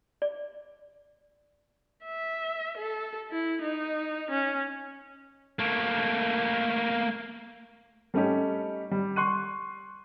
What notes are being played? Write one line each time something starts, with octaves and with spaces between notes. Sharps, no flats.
D5
E5
A4
E4
D#4
C#4
A3 A#3
G3 A3 C#4 D#4 G4
G3
C6 C#6 F#6 D#7